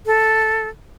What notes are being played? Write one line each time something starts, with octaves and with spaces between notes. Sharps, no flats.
A4